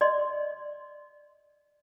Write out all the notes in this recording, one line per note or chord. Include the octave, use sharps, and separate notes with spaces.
D5 D#5 C6